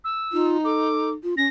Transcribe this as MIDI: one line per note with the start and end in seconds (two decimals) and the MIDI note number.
0.04 0.49 88
0.32 1.13 63
0.32 0.57 65
0.64 1.09 69
0.64 1.10 86
1.23 1.34 65
1.37 1.45 61
1.37 1.48 94